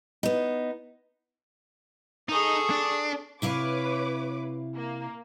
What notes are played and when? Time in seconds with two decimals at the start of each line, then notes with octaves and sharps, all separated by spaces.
0.23 B3 D#4
2.29 D#4 G#4 A4 C#6 D#6
2.70 D4
3.42 C3 E4 B4 C#5 F5 D6
4.75 A#3